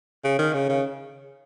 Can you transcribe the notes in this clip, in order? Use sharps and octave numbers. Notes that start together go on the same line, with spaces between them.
C#3
D#3
C#3
C#3